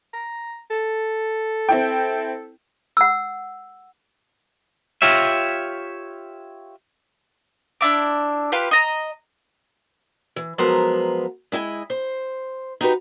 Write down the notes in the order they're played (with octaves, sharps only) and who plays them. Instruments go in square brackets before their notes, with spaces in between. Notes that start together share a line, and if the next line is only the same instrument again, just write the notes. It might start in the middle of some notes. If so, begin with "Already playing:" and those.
[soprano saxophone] A#5
A4
[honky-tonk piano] C4 E4 G5
[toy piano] F#5 E6
[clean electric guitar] F4 G4 C#5 E5
[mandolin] D4 E4 D6
F4 G4 B4
D#5 A#5
[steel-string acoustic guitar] E3
F3 F#3 G#3 B3 A#4 C5
G#3 E4 D#5 G#5
C5
D#4 F#4 G4 B4